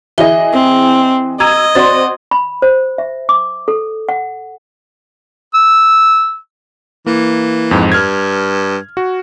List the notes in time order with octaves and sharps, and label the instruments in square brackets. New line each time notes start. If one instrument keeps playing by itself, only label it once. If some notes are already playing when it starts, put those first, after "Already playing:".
[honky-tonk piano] E3 G#4 D#5 [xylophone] E5 G7
[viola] C4
[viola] D#5 [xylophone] A#5 [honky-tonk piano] E6 G#6 D#7
[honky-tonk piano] C4 F#4 D5 [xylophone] C6 A6
[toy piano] B5
C5
E5
D6
A4
F#5
[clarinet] E6
[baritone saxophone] E3 [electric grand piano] A#3
[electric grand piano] F2 G#2
[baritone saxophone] G2 [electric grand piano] F6 G#6
[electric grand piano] F#4